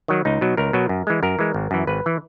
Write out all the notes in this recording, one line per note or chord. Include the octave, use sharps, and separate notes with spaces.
D#3 F#3
C#2 D#4
B2 F#3
C#2 A#4
B2 F#3
F#2
E3 G#3
F#2 A#4
E3 G#3
G#1
F#2 E3
G#1 B4
E3